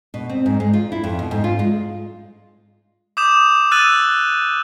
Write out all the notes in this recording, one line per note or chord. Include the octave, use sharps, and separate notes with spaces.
B2
C4
G#2
G#3
F4
E4
F2
B2
G#2
F4
G#3
D6 D#6 G6 E7
E6 F#6 A6 D#7 F#7